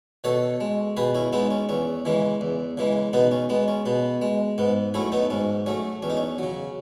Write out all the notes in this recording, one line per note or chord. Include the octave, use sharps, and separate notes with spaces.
B2 A4 C#5
G#3
B2 G#4 B4
C#4 E4
G#3 B3 D#4
C#4
E2 C#4
C#3 E3 G#3
E2
C#3 E3 G#3
B2 B3 D#4
C#4
G#3 B3
C#4
B2 B3
G#3
G#2 B3
F#3 A3 C#4 E4
B3 D#4
G#2 C#4
F#3 A3 C#4
E2 C#4
D#4
C#4
C#3 F#3